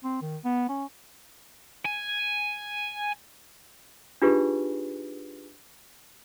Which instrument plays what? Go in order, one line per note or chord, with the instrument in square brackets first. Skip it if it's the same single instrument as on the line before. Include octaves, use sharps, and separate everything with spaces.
[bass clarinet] C4
D#3
B3
C#4
[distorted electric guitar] G#5
[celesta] D4 D#4 F4 G4 G#4 B4